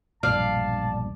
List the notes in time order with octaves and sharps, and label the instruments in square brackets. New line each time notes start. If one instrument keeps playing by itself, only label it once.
[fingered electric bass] E1 A#1 G2 [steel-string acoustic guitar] D5 [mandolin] F5 [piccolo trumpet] A5